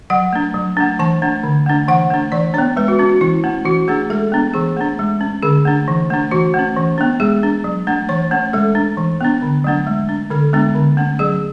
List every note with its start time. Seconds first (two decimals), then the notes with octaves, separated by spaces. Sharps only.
0.10 F#3 F#5
0.33 A3 D4
0.54 F#3
0.77 A3 D4
0.99 E3 A5
1.22 A3 D4
1.44 D3
1.66 A3 D4
1.88 E3 F#5
2.10 A3 D4
2.32 E3 D5
2.54 B3 D4 C#5
2.77 G#3 B4
2.88 F#4
2.99 C#4 F#4
3.09 F#4
3.21 E3 E4
3.44 A3 C#4
3.65 E3 F#4
3.88 A3 D4 G#4
4.10 G#3 A4
4.32 B3 D4
4.54 E3 G#4
4.77 A3 D4
4.99 G#3
5.21 C#4
5.43 D3 G#4
5.65 A3 D4
5.88 E3
6.10 A3 D4
6.31 E3 F#4
6.54 A3
6.59 C#4
6.77 E3
6.98 B3 D4
7.20 G#3 G#4
7.43 D4
7.64 F#3
7.87 A3 D4
8.09 E3 C#5
8.31 A3 C#4
8.53 G#3 A4
8.75 D4
8.98 E3
9.21 B3 D4
9.42 D3
9.64 F#3 A3 D4
9.87 G#3
10.09 D4
10.30 D3 A4
10.53 G#3 B3 D4
10.75 D3
10.97 A3 C#4
11.19 F#3 G#4